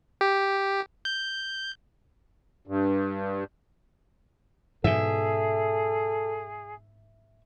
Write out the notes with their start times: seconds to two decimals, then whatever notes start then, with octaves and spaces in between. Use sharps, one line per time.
0.21 G4
1.05 G6
2.67 G2
4.84 G#2 B2 G#4 A4 E5